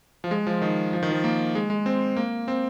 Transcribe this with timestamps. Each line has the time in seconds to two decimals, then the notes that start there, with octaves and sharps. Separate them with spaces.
0.24 F3
0.31 G#3
0.47 F3
0.62 D#3
0.93 F3
1.03 D#3
1.11 F3
1.24 A#3
1.55 G#3
1.70 G#3
1.86 C4
2.16 A#3
2.48 C4